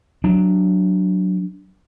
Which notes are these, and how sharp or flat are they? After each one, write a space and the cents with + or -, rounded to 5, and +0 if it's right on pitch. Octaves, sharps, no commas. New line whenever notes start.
F#3 +0 D4 +0